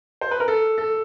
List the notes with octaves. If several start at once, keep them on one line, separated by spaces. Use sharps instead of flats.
C5
B4
A#4
A4
A4